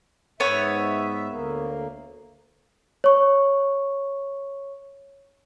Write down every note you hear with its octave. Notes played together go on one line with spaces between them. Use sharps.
G#2 B3 C#5 E5
D2 A#3
C#5 C#6